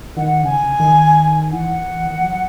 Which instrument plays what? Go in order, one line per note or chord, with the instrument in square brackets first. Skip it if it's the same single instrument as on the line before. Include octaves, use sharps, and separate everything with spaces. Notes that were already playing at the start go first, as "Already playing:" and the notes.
[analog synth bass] D#3 [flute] F#5
[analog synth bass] C#3 [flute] G#5
[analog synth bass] D#3
[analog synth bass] E3 [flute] F#5
[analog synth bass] D#3
E3
F#3